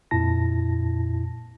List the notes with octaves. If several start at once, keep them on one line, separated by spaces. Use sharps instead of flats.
F2 A#2 E4 A5 A#6